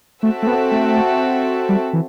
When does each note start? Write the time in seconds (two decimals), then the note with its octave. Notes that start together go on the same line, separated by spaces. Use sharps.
0.23 A3 C4 F#4 A4 E5
0.43 A3
0.47 B3
0.71 A3
1.69 G3
1.93 E3